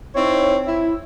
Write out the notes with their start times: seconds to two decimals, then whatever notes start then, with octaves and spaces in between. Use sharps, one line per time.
0.15 C4 D#4 E4 C#5
0.66 E4